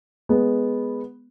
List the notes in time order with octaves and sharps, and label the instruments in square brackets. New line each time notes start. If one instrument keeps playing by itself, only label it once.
[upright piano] G#3 B3